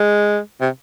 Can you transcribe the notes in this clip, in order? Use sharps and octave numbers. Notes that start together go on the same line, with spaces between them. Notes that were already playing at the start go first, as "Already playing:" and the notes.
Already playing: G#3
C3